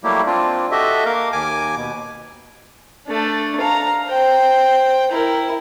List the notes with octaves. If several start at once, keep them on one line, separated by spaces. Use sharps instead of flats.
F#3 G3 A3 A#3 E4 G4
C4 D4 F4
F#4 G4 A4 D#5 E5
A#3 A#4 F5
D#2 G#5 D6
B2
A3 D4
F5 A#5
C5 G5
E4 A#4